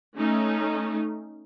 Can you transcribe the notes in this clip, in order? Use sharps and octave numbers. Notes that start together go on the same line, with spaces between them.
A3 C#4 D#4